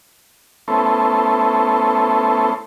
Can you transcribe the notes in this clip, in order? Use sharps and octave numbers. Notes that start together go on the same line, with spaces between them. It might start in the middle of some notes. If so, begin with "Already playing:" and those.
A3 B3 C#4 E4 A4 C5